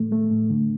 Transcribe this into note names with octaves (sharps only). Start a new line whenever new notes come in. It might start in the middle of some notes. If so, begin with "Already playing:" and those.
Already playing: A2 A3
A3
A2
D3